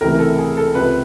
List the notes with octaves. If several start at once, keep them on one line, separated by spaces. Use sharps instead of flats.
C#2 C3 E3 A3 A#4
A4
G#4
A4
C#2 C3 F3 B4